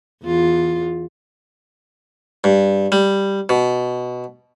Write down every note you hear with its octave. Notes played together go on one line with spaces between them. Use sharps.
E2 F4
G2
G3
B2